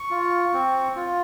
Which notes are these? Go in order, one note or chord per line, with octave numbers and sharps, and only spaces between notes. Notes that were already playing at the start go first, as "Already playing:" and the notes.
Already playing: C#6
F4
C4
F4